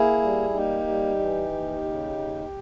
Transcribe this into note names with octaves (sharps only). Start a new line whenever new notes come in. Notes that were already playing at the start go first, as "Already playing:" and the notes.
Already playing: A#3 E4 G#4
G3
A#3 D#4 G4
G3
E3
D#2
C#3
D#2